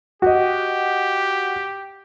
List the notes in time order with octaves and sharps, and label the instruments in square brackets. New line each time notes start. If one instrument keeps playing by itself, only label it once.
[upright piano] F#4 D#5 [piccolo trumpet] G4